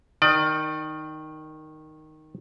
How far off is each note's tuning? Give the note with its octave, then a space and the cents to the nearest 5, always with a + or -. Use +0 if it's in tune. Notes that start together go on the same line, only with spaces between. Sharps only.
D#3 +0 D5 +35